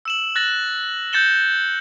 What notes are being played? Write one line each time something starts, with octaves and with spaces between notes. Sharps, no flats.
E6 E7 F#7
F#6 A6 A#6 F#7
G6 A6 C#7 E7 G7